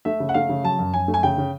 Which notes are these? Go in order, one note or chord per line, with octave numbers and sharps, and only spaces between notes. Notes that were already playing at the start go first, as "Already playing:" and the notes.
A3 E5
C#3
F#5
A3 F5
C#3
F#3 A5
F#2
F#2 G#5
A3
G#5
C#3 G5
C#3